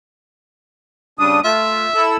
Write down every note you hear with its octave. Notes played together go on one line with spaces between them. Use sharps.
C#3 G3 D4 D#6
A3 F4 E5
E4 A4 E6